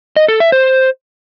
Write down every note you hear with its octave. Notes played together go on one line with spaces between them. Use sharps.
D#5
A4
E5
C5